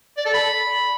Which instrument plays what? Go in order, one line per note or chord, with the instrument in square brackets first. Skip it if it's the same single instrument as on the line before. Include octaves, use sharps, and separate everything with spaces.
[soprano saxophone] D5
A4
B5